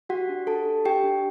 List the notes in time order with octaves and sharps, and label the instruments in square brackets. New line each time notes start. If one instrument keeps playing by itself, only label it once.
[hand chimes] F#4 G4 F#5
D4
G4 A4 A5
D4
G4 G5
D4